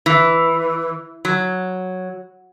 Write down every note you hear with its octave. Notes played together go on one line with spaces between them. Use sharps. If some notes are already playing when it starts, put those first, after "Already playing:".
E3
F#3